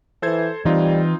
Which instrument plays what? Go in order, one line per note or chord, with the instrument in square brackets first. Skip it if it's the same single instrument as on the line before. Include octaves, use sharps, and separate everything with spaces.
[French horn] E3 [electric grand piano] A4 C5 G#6
[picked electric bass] E3 [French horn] G3 [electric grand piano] C4 D#4 F4